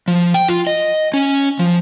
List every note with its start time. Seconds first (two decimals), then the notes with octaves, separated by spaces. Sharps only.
0.08 F3
0.34 G5
0.48 F4
0.67 D#5
1.14 C#4
1.59 F3